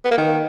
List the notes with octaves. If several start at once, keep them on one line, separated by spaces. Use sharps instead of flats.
B3
A#3
D#3